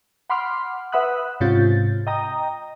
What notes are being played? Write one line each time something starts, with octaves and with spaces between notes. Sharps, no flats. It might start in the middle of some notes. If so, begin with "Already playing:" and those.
F#5 B5 C6 D6 F6
B4 E5 F#5 B5 D#6 F#6
G#2 C3 C#4 F4 G6 A6
D#5 G5 A#5 D#6